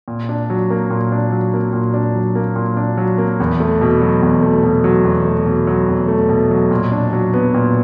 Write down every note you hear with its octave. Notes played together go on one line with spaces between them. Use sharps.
A#2
D4
F#3
A#3
A#2
D4
F#3
A#3
A#2
D4
F#3
A#3
A#2
D4
F#3
A#3
E2
A3
B2
F#3
E2
A3
B2
F#3
E2
A3
B2
F#3
E2
A3
B2
F#3
A#2
D4
F#3
B3
A#2